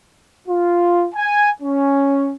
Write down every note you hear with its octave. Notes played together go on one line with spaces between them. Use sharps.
F4
G#5
C#4